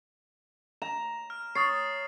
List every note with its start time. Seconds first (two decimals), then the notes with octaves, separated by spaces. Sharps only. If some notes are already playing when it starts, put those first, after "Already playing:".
0.82 A#5 E7
1.30 F6
1.55 C#5 D#6 A6 C7